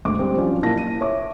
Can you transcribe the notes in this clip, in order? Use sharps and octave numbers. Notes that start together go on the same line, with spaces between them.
D2 G#2 D6
G3 C4
F3 F#3 C#4 D4 F4
A#2 A#3 E4 A5 A#6
D#7
C#5 E5 D6